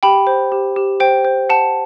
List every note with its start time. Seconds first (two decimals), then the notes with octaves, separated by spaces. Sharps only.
0.03 G4 G5 B5
0.27 C5
0.52 G4
0.76 G4
1.00 C5 G5
1.25 C5
1.50 F#5 A5